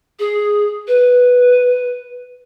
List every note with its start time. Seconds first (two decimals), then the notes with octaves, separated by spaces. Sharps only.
0.19 G#4
0.87 B4